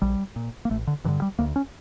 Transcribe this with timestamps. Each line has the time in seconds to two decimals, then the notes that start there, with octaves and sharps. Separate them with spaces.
0.02 A#1 G3
0.36 A#2
0.65 A#3
0.71 A1 A3
0.87 D3
1.05 G2 E3
1.09 D3
1.22 G3
1.39 D2 A#3
1.56 C#4